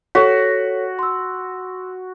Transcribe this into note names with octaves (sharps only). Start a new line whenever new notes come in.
F#4 A4 C#5 B6
C6 E6